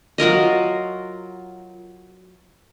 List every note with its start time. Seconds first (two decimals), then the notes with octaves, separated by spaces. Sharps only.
0.18 F#3 F4 A#4 D#5